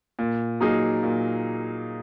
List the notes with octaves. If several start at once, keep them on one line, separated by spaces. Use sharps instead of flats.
A#2
F#3 A#3 D#4 G#4
A#2